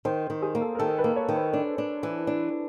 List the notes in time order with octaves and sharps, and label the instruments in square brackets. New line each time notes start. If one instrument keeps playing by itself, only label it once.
[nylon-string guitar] D#3 [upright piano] C5
[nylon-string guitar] D#3
[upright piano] G#4
[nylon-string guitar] A#3
[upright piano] A4
A#4
[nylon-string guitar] D#3 [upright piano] A4
[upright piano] B4
[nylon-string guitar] A#3
[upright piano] C#5
[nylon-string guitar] D#3
[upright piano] C5
[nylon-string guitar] D4
D4
E3
D4